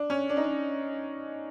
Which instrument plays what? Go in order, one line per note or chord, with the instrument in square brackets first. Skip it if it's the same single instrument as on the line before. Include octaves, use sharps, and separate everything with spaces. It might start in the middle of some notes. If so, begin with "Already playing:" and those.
Already playing: [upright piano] D4
C#4
D4
D#4
D4